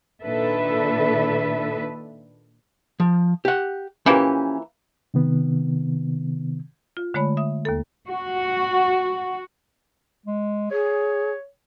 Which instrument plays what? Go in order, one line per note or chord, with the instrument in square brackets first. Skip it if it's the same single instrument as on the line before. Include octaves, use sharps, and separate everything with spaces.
[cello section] A#2 D#3 D4 A4 B4 E5
[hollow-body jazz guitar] F3
G4 F#5
[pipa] E3 F3 A#3 [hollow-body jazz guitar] C#4 G4
[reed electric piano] C3 D#3 B3
[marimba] F4
D3 G#3 A3 C#5 B5
E5 D#6
D#2 A#3 A4
[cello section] F#4
[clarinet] G#3
[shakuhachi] G#4 [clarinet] C#5